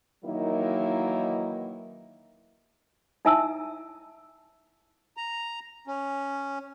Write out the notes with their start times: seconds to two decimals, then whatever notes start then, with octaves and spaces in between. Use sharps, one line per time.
0.25 D#3 E3 F#3 A#3 D#4 E4
3.25 D#4 E4 E5 G#5 A5 E6
5.17 A#5
5.87 C#4